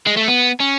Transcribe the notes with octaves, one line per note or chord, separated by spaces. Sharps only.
G#3
A3
B3
C#4